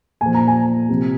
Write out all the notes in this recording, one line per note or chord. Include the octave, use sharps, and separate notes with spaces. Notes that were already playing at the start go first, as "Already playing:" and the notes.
A#2 F3 G#5
A#5
G#5
C3 F3